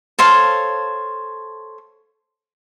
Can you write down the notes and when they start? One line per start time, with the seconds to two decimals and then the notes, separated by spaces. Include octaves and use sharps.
0.19 A4 C5 C#5 F5